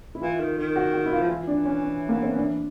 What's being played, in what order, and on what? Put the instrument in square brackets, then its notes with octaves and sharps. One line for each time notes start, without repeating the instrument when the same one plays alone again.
[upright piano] E4
[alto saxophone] E3 [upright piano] F4
[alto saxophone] D#3
D#3
[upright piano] F#4
F#4
E4
F4
[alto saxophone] F3
[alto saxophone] E3 [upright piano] F4
[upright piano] D4
C#4
C#4
A#3
B3
C4
C#4
D4